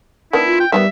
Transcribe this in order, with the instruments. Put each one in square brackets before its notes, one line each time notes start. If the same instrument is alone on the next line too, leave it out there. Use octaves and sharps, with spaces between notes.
[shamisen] D#3 B3 D4 [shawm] E4
[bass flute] F4
[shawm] G5
[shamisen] D#3 F3 B3 [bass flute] G3 [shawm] E5